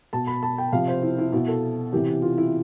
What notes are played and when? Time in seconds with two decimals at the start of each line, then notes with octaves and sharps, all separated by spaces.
0.13 B2 A5
0.27 B5
0.43 A5
0.58 G5
0.72 C3 F3 F5
0.88 C5
1.02 E4
1.18 E4
1.33 B2 E4
1.48 A4
1.92 C3 E3 G4
2.22 F4
2.38 E4